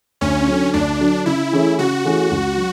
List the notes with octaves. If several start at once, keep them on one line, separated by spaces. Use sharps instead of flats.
D2 C#4
D3 F#3
D2 D4
D3 F#3
C#3 E4
E3 A3 C#4 G#4
C#3 F#4
E3 A3 C#4 G#4
C#2
F#3